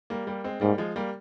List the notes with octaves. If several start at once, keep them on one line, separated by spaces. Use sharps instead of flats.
G3 A#3
G3 A#3
G#3 C4
G#2 G3 A#3
F3 G#3
G3 A#3